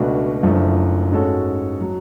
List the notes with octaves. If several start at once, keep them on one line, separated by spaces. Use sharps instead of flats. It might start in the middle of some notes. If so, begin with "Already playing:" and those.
Already playing: C#2 B2 A3 D4 F#4
F#1 F#2 F3 A3 D4
G#2 G#3 C#4 F#4 A4
F#3